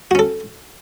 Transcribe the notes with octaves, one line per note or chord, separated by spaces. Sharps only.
C#4 F#4 A4